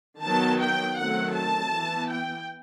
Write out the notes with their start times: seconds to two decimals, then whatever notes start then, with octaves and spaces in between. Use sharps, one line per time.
0.23 D#3 F#3 B3 A5
0.61 G5
0.98 D#3 F#3 A3 C4 F#5
1.36 A5
1.73 E3 B3
2.11 G5